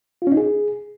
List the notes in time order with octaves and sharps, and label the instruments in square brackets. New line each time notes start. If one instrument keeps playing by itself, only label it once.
[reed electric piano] F4
C#4
D#4
G#4